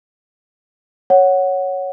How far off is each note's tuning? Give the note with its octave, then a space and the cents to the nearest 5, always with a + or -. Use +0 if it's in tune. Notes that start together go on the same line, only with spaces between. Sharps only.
C#5 +0 F#5 +0